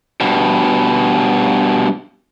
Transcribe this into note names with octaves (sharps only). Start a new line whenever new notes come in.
G2 B2